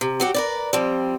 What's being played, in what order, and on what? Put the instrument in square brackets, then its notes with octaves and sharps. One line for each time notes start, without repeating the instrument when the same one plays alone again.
[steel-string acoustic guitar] C3
F#3 F#4 G4
A#4 B4 D5
F3 G3 C4